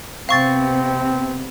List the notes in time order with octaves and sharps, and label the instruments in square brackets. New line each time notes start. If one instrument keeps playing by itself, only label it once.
[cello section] C3 B3 [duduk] C4 [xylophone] F5 C#6 A6